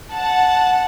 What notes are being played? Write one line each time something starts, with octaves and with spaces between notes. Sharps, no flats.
F#5 A5